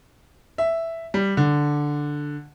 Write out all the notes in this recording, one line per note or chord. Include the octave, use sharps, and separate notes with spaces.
E5
G3
D3